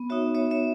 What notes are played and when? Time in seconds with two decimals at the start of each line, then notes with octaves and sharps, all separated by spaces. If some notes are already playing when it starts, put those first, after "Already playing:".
Already playing: B3
0.10 D#4 F#4 C#5 E5
0.35 B3 C#5 E5
0.51 C#5 E5